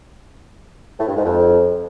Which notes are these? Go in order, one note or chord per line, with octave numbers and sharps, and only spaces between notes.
A2
G2
G#2
F2